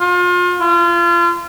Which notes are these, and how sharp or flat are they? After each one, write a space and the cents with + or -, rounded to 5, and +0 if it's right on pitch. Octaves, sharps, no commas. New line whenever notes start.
F4 +35
F4 -30